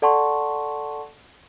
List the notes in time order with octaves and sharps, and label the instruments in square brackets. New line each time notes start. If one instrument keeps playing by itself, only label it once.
[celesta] A4 D5 F#5 A5 C6 C#6